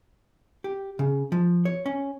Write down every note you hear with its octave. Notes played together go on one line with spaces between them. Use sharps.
G4
C#3
F3
C#5
C#4